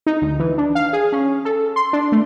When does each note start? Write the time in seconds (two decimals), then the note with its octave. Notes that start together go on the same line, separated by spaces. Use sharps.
0.06 D#4
0.22 D2
0.39 E3
0.58 D4
0.75 F5
0.93 G#4
1.12 C#4
1.45 A4
1.76 C6
1.93 D4
2.12 A3